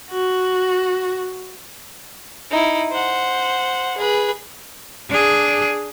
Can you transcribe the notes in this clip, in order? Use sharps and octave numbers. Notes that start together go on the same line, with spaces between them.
F#4
D#4 E4
C5 F#5
G#4 B4
D4 G#4